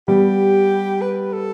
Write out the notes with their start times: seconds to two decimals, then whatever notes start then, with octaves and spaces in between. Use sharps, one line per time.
0.08 G3 B3 G4
1.01 B4
1.33 A4